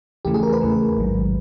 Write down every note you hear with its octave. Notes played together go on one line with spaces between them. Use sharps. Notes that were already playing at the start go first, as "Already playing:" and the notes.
E2 C#3 E3 A3 G4
G#4
A#4
B4
E2 C#3 E3 A3
A1 G#2 D#3 F#3